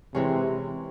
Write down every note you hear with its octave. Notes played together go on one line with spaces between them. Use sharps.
C3 E3 G#3 C#4